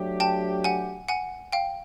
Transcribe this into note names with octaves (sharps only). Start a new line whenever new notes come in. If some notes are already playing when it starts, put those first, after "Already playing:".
Already playing: F#3 A3 D4 G4
G5 A5
F#5 G#5
F#5 G#5
F5 G5